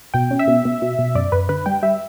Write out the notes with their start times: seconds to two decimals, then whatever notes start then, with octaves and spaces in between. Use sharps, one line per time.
0.14 B2 G5
0.31 C#4
0.39 E5
0.48 B2
0.65 B2
0.82 B2
0.99 B2
1.15 F#2 D5
1.32 F#2 B4
1.49 D3 B4
1.66 G3 G5
1.83 G3 E5